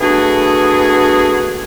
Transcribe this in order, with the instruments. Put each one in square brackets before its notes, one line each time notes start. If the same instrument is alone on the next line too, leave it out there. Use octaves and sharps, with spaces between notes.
[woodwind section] A3 B3 D4 F#4 G#4